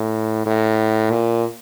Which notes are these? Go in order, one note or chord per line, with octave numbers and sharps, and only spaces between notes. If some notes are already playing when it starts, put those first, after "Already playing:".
Already playing: A2
A2
A#2